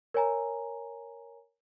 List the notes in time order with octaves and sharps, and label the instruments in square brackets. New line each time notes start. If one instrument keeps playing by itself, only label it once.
[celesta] A#4 C#5 G#5 A#5